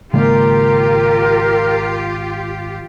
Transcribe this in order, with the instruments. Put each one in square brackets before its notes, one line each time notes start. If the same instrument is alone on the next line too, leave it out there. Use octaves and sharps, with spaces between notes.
[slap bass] G#1 [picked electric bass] C#3 G#3 A#3 [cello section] F4 G4 [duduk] A#4